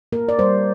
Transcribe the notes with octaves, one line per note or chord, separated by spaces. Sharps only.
A#3 A#4
D5
G3 C5